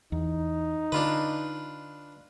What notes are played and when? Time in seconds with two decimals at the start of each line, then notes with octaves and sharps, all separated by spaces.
0.12 E2 D#4
0.92 D3 D4 F4 B4